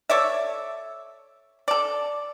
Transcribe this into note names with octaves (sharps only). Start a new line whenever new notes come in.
A4 C#5 D5 E5
A4 D5